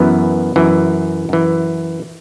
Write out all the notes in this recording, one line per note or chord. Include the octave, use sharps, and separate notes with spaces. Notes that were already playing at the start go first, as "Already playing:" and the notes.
Already playing: F#2 E3 B3
F#2 E3
F#2 E3